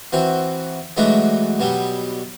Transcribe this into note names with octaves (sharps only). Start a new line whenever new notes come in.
E3 C4 F#4
E3 F#3 G#3 A3 D4 F#4
B2 F#3 G3